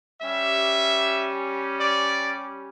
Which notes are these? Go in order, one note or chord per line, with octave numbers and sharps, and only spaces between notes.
G3 C#4 G4 E5
D5